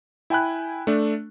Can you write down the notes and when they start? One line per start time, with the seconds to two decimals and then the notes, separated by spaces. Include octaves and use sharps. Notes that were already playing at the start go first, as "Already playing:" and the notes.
0.30 E4 G5 G#5 B5 F#6
0.87 A3 D4